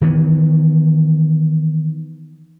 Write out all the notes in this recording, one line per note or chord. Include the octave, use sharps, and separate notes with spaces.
D#3 E3 G3 B3